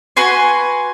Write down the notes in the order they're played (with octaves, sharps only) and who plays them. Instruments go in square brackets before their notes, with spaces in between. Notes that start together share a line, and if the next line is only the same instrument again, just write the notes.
[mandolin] F#4 B4 G#5 C6